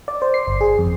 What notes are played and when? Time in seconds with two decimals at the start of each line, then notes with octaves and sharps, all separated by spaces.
0.08 D5
0.22 C5
0.34 C7
0.47 G1
0.61 G#4
0.78 F2